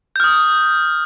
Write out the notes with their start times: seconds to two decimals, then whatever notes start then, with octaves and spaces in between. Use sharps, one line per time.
0.16 G6
0.20 F6
0.24 D#6